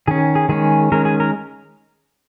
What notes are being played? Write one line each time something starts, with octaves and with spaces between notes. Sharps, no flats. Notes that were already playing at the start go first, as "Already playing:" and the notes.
D#3 C#4 G#4
G#4
D#3 G#3 C#4 G#4
D#3 G#3 C#4 A#4
G#4
A#4